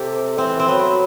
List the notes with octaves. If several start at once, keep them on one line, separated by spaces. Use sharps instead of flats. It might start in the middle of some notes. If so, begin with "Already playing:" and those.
Already playing: C3 G4 A4
E3 C4
C4
F#3 B3